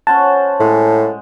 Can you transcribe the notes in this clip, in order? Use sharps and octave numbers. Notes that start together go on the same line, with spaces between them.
C#4 C5 F#5 A5
A2 G#3